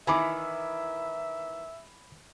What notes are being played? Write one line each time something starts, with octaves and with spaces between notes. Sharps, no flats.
D#3 E3 E5 G#5 B5 D6